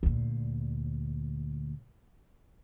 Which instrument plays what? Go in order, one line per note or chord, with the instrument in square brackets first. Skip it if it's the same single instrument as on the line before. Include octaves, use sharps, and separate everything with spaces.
[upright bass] D2 A#2